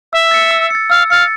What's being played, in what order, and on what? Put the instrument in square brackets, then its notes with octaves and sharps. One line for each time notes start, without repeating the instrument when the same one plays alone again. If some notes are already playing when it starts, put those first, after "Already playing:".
[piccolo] E5 [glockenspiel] E6
[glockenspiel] A6 C#7
E6
A6 C#7
[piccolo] F5 [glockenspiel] E6
[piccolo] F5 [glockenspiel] A6 C#7